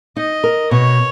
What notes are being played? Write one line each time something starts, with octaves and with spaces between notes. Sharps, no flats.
D#4 D#5
A#4
B2 C#5